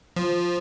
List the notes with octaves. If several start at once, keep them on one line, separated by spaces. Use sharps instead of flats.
F3